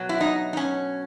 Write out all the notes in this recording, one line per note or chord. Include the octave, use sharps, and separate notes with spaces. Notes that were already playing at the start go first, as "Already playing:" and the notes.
Already playing: B2 F#3
E4
D#4
D#4
C#4